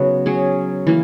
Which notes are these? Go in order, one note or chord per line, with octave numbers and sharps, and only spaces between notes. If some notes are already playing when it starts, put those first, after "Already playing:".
Already playing: C#3 F#3 B3 D#4 F#4
F#3 C#4 G#4
E3 A#3